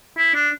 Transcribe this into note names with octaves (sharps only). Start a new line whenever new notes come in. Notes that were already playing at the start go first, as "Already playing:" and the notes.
E4
D4